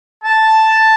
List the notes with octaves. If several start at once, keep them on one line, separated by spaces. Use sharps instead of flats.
A5